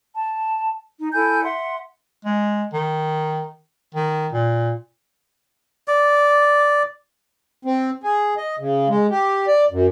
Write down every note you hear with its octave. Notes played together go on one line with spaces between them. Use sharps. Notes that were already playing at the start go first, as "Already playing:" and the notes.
A5
D#4
E4 A4 G#5 G6
E5 F#5 C6
G#3
D#3
D#3
A#2
D5
C4
G#4
D#5
C#3
G#3
G4
D5
F#2